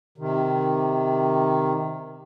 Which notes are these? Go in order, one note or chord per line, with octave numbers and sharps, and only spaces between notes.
C3 D#3